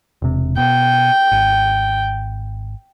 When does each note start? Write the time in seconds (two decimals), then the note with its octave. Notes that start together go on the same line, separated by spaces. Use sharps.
0.22 E1 C3
0.57 B2 G5
1.32 G#1